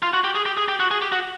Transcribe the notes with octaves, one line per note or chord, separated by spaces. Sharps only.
F4
F#4
G4
G#4
G4
G#4
G4
F#4
G#4
G4
F#4